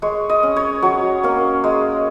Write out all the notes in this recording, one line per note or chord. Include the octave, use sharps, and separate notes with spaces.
G#3 C#5
D#5
C#4
C#5
F#3 C#5
A#3 C#4
G#3